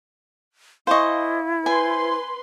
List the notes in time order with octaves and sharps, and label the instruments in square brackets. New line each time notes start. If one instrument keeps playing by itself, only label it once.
[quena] E4 [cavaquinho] C5 D#5 [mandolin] F5 G#5 C#6
[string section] B4 C6 [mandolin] C5 [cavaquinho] G#5